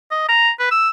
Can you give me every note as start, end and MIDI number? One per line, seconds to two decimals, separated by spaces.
0.11 0.27 75
0.29 0.50 82
0.60 0.67 71
0.71 0.90 88